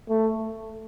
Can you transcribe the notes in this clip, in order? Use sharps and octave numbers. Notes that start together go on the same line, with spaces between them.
A3